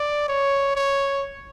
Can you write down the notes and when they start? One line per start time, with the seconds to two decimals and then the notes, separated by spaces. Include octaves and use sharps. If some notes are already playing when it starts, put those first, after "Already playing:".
Already playing: D5
0.28 C#5
0.75 C#5